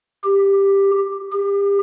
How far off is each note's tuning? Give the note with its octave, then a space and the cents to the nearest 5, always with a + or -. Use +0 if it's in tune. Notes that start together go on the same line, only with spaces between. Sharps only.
G4 +10
G4 +35